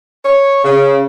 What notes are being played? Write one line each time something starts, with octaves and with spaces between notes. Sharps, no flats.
C#5
C#3